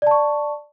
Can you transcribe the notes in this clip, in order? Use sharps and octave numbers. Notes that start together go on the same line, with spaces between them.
D5 A5 C#6